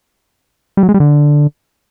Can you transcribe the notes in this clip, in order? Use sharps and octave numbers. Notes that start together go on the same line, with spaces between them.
G3
F#3
G#3
G3
D3